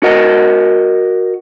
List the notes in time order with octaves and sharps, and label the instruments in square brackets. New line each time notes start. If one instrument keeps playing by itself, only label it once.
[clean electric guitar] F#4 A#4 D#5 F#5